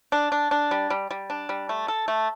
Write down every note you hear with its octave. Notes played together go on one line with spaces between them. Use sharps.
D4
D4
D4
G3
G3
G3
D4
G3
A3
A4
A3